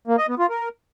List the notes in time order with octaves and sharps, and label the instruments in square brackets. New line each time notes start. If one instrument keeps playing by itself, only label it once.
[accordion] A#3
D#5
B3
F4
A#4